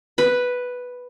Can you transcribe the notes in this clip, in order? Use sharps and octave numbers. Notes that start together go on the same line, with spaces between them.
B4 B5